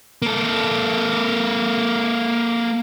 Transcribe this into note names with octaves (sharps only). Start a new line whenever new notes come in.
A#3 A4